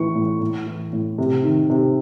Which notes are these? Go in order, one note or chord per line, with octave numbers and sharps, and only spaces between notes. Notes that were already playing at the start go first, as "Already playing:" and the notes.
Already playing: A2 E3 C#6
A2
A2
E3
A2
C3
D#3
C3